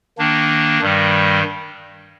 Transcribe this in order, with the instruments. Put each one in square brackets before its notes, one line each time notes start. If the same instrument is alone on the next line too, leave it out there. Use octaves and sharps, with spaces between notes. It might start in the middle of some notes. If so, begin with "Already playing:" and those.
[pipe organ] D#3 A#3 D4
G2 D#3 G3